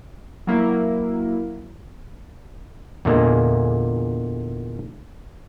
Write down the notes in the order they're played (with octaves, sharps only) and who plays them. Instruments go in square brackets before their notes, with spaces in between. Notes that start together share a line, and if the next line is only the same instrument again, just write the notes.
[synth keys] F#3 A#3 E4
[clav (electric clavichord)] E2 A#2 D3 E3 G#3 A#3